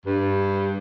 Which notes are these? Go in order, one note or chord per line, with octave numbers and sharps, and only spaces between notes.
G2